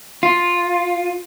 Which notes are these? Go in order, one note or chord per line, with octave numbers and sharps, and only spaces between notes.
F4